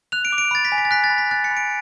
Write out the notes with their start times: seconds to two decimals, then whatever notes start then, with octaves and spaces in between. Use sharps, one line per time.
0.12 F#6 F7
0.25 D7
0.32 D6
0.38 D7
0.51 B5 A6
0.65 B6
0.72 G#5
0.78 B6
0.85 A6
0.91 F#6 B6
1.04 A6
1.10 B5
1.18 B6
1.31 F#6 A6
1.44 C#7
1.51 B5
1.57 D7